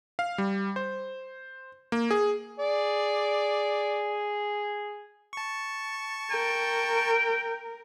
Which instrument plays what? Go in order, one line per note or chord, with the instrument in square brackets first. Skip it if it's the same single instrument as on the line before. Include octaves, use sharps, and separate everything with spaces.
[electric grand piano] F5
G3
C5
A#3
G#4
[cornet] G#4 [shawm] D5
[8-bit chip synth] A5 C#6
[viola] A#4 [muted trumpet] G5